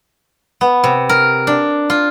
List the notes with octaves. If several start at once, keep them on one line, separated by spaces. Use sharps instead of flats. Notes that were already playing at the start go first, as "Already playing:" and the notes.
B3
C3
A#4
D4
F4